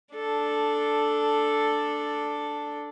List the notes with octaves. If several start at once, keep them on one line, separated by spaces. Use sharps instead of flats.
D4 A4